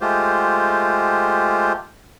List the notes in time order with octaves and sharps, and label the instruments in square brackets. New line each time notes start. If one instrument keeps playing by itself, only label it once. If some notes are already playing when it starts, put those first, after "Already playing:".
[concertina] G#3 A3 F4 G4 C5